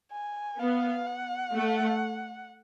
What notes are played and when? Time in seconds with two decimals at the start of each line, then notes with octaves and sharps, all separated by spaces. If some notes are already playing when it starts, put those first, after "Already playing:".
0.12 G#5
0.59 B3 F5
1.07 F#5
1.55 A3